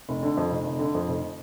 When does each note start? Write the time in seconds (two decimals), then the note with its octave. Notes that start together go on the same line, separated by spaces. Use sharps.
0.09 F1
0.23 D3
0.37 F2
0.51 F1
0.66 F1
0.79 D3
0.95 F2
1.08 F1